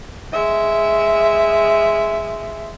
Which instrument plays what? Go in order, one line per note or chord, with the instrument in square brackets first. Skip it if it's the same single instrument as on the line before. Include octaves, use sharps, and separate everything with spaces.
[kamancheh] G#3 E5